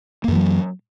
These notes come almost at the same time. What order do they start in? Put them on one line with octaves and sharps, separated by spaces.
A#3 F#2 E3 F#3